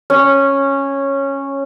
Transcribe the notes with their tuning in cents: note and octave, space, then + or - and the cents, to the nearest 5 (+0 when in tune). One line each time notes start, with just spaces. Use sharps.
C#4 -10